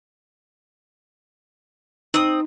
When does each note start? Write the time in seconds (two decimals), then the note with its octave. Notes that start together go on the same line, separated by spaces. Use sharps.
2.14 C4 D#4 D#6